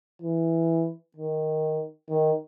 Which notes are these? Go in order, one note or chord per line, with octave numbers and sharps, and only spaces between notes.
E3
D#3
D#3